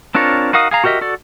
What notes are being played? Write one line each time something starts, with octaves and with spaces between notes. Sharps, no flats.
C4 D4 F4 A#4 C#5
D#4 F#4 A#4 F5 D#6
G#4 F5 A#5
F#4 G4 A#4 D#5 E5
F#4 A4 D5